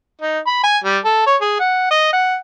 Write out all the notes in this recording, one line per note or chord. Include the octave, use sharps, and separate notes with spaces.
D#4
B5
G#5
G3
A4
C#5
G#4
F#5
D#5
F#5